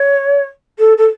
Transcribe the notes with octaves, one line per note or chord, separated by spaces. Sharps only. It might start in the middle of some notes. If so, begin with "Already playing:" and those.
Already playing: C#5
A4
A4